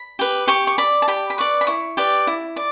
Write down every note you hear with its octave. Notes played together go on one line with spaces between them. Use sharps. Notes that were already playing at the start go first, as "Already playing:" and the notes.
Already playing: B5
G4 B4
G4 C#6
C#6
D5 B5
A5
G4 B5
B5
B4 D5 C#6
B5
E4 C#6
G4 B4 D5
E4
D5